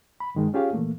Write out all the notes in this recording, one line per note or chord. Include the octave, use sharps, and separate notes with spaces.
B5
G2 D#3 G#3
C#4 F4 G4 G#4 C#5 F5
A#2 E3 A3 A#3